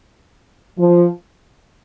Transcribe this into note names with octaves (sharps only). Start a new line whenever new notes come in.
F3